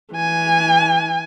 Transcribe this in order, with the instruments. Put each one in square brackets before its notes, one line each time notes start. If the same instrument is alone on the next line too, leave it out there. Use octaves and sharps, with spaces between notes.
[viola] E3 G#5